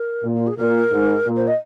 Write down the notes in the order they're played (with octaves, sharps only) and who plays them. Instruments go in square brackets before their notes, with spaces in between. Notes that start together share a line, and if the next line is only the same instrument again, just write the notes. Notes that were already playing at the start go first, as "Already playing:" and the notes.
Already playing: [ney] A#4
[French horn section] A#2
[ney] F4
G#4
[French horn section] A#2 [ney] A#4
[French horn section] G#2
A#2
[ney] C5
D#5